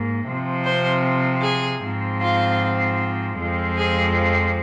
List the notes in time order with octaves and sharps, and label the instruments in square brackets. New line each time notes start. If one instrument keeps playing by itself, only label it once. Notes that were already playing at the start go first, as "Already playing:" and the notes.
Already playing: [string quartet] G#2 A#3
C3 F3 C4
C5
G#4
G#2 F3 C4
F4
F2 F3 G#3 C4
G#4